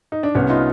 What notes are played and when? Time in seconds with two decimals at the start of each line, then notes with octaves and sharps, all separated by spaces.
0.12 D#4
0.23 D4
0.35 C2 B3 C#4
0.50 D#4 F4